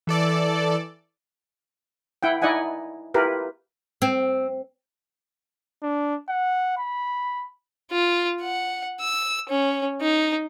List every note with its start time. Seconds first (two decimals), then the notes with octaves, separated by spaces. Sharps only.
0.07 E3 A4 D5
2.23 E4 F#5 G5
2.42 D#4 E4 D5 D#5 F#5 G#5
3.14 E4 F4 G4 A#4 B4
4.02 C4
5.83 D4
6.29 F#5
6.77 B5
7.91 F4
8.41 F#5
9.01 E6
9.49 C#4
10.01 D#4